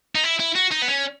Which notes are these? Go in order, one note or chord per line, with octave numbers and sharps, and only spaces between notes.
D#4
E4
E4
F#4
D#4
B3
C#4